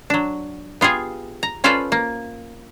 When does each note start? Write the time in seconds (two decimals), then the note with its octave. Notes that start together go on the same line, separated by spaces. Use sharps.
0.10 F#3 D4
0.81 B3 F4 G4 G#4
1.43 A#5
1.64 C#4 F4 A4 B4 C5 D5
1.92 A#3